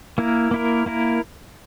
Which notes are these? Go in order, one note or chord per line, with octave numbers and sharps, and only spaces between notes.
A#3 E4 A#4
A#3 E4 A#4
A#3 E4 A#4